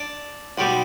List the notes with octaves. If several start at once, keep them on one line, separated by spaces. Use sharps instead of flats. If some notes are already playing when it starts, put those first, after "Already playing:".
Already playing: D4
B1 B2 G3